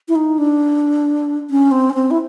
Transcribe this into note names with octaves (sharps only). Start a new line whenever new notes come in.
E4
D#4
D4
C#4
C4
C#4
C4
E4